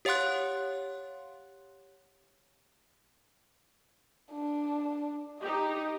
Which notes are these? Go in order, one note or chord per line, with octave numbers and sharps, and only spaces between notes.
G4 C#5 F5 F#5 C6 F#6
D4
D#4 G4 D#5